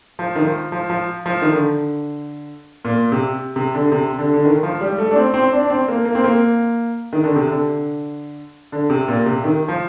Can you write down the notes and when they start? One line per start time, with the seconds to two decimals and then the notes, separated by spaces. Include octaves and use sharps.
0.19 F3
0.36 D#3
0.44 F3
0.72 F3
0.90 F3
1.26 F3
1.42 D#3
1.52 D3
2.85 A#2
3.12 C3
3.56 C3
3.74 D3
3.87 D3
3.92 C3
4.18 D3
4.34 D3
4.45 D#3
4.63 F3
4.81 G3
4.98 A3
5.11 D4
5.16 C4
5.34 C4
5.53 D4
5.64 D4
5.70 C4
5.88 A#3
6.05 A#3
6.15 C4
6.24 A#3
7.13 D#3
7.24 D3
7.36 C3
7.48 D3
8.72 D3
8.90 C3
9.08 A#2
9.26 C3
9.44 D#3
9.68 F3